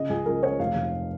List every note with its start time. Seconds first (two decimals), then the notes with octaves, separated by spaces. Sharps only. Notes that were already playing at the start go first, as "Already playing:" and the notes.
Already playing: C#3 D#5
0.09 C#2 G#4
0.26 C#2 A#4
0.43 C#3 C#5
0.59 F1 F5
0.76 F1